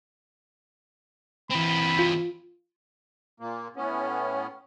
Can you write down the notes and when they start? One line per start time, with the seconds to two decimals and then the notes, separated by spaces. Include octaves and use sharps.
1.51 E3 C4 B5
1.99 F4
3.40 A#2 A#3
3.76 A2 B3 C#4